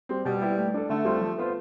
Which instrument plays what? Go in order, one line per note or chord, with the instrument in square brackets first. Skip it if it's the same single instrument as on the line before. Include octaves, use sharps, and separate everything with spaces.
[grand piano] G3 C4
[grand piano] B2 [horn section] G3
[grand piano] B3 E4 G4
A3
D4 A4
[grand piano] D3 [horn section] A3
[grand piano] G3 C4 F4
F3
B3 F4 C5